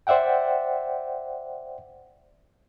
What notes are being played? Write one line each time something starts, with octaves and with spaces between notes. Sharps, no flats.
C5 D5 E5 F#5 G5